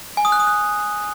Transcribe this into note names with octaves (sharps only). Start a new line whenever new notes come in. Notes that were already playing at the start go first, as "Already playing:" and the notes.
G#5
D#6
F#6
D#6
F#6